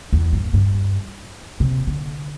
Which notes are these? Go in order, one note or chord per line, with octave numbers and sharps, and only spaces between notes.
E2
G2
G2
C3
D3